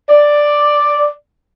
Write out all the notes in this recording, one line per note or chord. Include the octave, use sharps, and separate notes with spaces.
D5